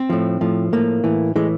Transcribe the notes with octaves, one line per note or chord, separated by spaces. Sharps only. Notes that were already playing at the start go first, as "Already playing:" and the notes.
Already playing: C4
A2 F3
A2 F3
A2 F3 A#3
A2 E3
A2 E3 G#3